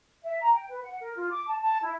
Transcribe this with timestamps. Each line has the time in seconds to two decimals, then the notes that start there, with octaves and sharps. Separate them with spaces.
0.23 E5
0.41 A#5
0.54 G5
0.70 B4
0.83 F#5
1.00 A#4
1.16 F4
1.31 D6
1.47 A5
1.61 A5
1.83 E4